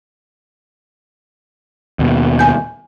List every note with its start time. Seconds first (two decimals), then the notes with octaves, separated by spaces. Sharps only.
1.99 D#2 B2
2.39 G#5 G6